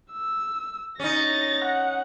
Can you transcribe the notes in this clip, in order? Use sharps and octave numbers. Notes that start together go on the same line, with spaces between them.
E6
C#4 D#4 A6 A#6
F#5